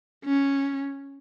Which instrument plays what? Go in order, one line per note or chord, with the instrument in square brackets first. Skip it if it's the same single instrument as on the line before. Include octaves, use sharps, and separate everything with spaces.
[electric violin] C#4